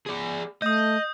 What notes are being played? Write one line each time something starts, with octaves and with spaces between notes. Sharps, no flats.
G#4 D5
A3 D#5 D#6 G6